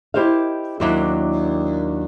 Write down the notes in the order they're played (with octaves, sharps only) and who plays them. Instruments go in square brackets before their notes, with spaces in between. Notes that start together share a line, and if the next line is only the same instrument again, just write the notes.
[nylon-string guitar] E4 G4 C5 D#5 F5
D#2 F#3 D4 E4